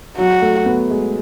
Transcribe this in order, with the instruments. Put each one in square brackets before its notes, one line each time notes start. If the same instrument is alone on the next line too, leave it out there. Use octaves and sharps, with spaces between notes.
[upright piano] F#3 [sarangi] F#4
[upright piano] A3
B3
G#3